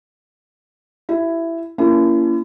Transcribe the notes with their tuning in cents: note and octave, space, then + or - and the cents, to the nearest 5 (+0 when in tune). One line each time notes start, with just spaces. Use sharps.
E4 +10 G4 -35
A#3 +0 C#4 +35 E4 +40